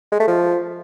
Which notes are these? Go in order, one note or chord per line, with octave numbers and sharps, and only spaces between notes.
G#3
A3
F3